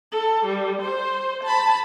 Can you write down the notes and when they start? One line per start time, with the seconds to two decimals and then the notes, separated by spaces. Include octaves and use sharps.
0.12 A4
0.45 G3
0.82 C5
1.43 A5 B5